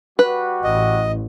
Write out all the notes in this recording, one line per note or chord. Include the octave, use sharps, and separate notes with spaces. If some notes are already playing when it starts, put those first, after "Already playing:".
G3 F#4 B4
A1 D#5